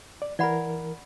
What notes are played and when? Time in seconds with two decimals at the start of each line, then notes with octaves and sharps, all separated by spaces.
0.22 D5
0.39 E3 A#4 D5 F#5 B5